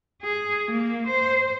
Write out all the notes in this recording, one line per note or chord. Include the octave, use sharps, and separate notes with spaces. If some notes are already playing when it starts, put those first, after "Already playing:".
G#4
A#3
C5